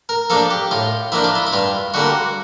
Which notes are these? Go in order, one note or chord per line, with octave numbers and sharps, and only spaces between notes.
A#4
F3 A#3 D4 A4
G4
A2 F4
F3 A#3 D4 E4
F4
E4
E4
G2 F4
D3 G3 A#3 F#4